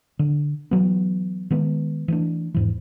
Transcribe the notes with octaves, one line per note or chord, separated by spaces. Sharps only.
D3
E3 F#3 B3
D#3 G#3 B3
E3 A3 D4
E2 G#2 E3